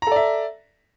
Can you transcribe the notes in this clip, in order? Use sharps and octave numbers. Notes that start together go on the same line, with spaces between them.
A4 D5 E5 A#5